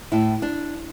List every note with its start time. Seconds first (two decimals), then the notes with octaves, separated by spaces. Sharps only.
0.12 A2 E4
0.42 D4